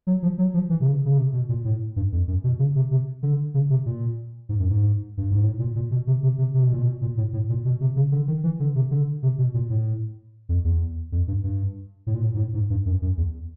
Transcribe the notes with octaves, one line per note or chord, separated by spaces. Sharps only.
F#3
F3
F#3
F3
E3
C3
C#3
C#3
C3
B2
A#2
A2
G2
F2
F#2
B2
C#3
C3
C3
D3
C#3
C3
A#2
G#2
F#2
G#2
G2
G#2
A2
A#2
A#2
B2
C3
C3
C3
C3
B2
A#2
B2
A#2
A2
A2
A#2
B2
C3
C#3
D3
D#3
E3
D3
C3
D3
C3
B2
A#2
A2
F2
E2
F2
G2
G2
A2
A#2
A2
G#2
A2
G#2
G2
F#2
F#2
E2